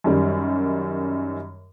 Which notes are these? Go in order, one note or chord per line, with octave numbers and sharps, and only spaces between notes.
F#2 D#3 G3